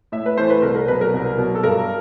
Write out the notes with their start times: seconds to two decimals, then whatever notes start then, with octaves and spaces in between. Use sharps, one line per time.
0.12 A2 E5
0.26 B4
0.37 E3 A3 C5
0.50 B4
0.62 C2 A#4
0.76 A#4
0.88 B2 F#3 B4
1.01 A#4
1.14 C2
1.38 B2 F#3
1.55 A4
1.63 G2 A#4